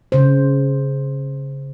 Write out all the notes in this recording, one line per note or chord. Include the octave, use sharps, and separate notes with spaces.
C#3 C5